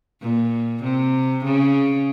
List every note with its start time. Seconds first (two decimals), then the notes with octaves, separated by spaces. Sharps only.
0.21 A#2
0.83 C3
1.45 C#3